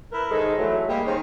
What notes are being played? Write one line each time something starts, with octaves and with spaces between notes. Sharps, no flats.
E4 A#4 B4
D#3 G#3 A4 C5
E3 F#3 A3 E4
G3 G#3 A#3
D#3 G#3 C#4 C5